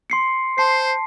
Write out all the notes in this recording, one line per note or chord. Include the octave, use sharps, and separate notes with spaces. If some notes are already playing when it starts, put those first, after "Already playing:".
C6 C7 C#7
C5 A5 C7